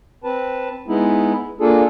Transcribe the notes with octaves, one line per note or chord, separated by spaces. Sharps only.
C4 B4 A5
G#3 B3 D#4 E4
A#3 D4 F4 G#4 A4